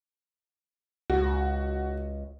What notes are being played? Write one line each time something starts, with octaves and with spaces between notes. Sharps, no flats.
C#2 F#4